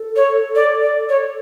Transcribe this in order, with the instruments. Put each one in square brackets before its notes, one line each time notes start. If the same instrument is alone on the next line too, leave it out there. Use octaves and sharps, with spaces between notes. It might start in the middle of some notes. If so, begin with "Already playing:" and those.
Already playing: [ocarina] A4
[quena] C#5
D5
D5
C#5